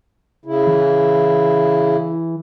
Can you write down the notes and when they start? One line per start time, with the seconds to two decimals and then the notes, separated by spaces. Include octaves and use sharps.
0.45 C#3 E4
0.67 E3